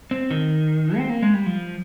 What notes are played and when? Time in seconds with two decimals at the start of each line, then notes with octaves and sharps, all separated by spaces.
0.11 C4
0.31 D#3
0.97 C4
1.10 A#3
1.22 G#3
1.34 G3
1.46 F3